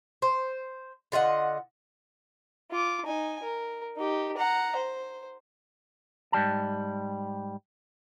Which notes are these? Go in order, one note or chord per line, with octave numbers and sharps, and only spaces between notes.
C5
D3 F4 D#5 F#5
F4 D6
D#4 G#5
A#4
D#4 G4
F#5 A#5
C5
G#2 G3 A5